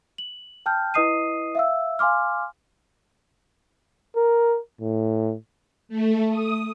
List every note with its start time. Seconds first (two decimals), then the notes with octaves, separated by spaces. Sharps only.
0.18 F#7
0.66 G5 A5 F6 G6
0.94 E4 B4 D#5 D#6 C7 D#7
1.55 E5 F5 E6
1.99 F5 G#5 C6 D6 F6
4.16 A#4
4.81 A2
5.89 A3
6.30 D#6